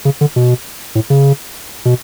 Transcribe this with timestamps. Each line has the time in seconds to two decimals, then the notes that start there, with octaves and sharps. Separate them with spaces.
0.05 C#3
0.21 D3
0.36 B2
0.95 A2
1.10 C#3
1.85 B2